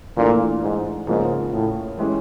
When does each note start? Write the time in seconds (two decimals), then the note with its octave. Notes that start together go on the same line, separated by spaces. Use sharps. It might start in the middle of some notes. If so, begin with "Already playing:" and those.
0.17 A#2 E3 A3 D4 F4
0.62 G#2
1.07 G#2 C#3 F3 A#3
1.53 A2
1.98 E3 G#3 C#4 E4 G4